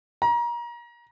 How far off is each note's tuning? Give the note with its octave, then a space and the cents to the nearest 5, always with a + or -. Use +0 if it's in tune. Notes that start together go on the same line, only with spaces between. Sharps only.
A#5 +30